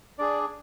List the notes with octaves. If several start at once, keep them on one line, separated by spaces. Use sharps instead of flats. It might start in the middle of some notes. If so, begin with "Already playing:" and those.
D4 G#4 D5